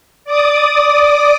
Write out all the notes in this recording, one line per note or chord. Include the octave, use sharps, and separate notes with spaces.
D5 D6 D#6